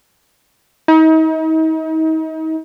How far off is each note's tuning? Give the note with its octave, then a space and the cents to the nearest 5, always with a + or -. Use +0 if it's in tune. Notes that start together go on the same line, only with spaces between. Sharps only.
D#4 +35